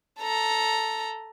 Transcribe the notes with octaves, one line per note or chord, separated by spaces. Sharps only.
A4 A#5